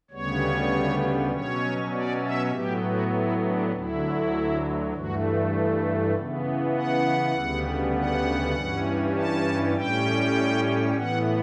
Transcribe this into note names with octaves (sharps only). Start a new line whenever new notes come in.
D2 C#3 G3 B3 C#5
B2 F#3 C#4 C#5
D5
E5
A2 F#3 B3 G4
F#4
E4
D4
D2 D3 F#3 E4
G2 E3 A3 F#4
C#3 E3 B3
F#5
D2 C#3 G3 B3
F#5
G2 E3 G3 C#4
A5
A2 G3 C#4 G5
A2 E3 B3 F#5